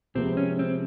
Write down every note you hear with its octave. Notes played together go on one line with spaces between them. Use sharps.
C3 F3 G#3 B3 C4
C#4
C4